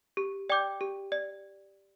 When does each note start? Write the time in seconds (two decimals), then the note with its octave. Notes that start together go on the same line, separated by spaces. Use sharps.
0.17 G4
0.50 D5 G5 D6 G6
0.81 G4
1.12 D5